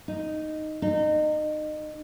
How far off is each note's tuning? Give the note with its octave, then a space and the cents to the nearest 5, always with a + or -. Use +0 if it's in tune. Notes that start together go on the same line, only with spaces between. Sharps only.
D#4 -5
D#4 -30